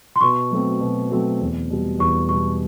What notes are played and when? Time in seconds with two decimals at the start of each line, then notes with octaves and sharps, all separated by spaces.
0.16 C6
0.21 B2 C#6
0.51 F#3 A3 C4
0.80 B2
1.10 F#3 A3 C4
1.41 E2
1.70 B2 G3
1.99 E2 C#6
2.29 B2 G3 C#6